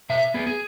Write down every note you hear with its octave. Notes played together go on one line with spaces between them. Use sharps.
B2 E5
B3 G#4
G#4